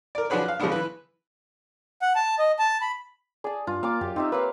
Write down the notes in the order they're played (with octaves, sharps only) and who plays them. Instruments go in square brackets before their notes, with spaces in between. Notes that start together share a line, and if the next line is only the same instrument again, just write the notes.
[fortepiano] A#4 D5
F3 D4 F#4 G#4 B4 C#5
F5 F#6
C#3 F3 G3 G#3 B3 D4
E3 B4
[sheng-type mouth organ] F#5
A5
D#5
A5
B5
[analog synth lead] G#4 [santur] D5 A5
[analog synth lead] G2 [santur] F4
[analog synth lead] A#3 [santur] F5 G#5 D6
[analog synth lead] F#2 [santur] G4
[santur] C4 G4 E5 [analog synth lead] D#4
[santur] A#3 C#5 F5 [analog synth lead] B4